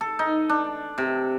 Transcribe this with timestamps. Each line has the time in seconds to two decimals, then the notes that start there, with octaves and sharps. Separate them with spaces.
0.01 A4
0.19 D#4
0.49 D4
0.98 C3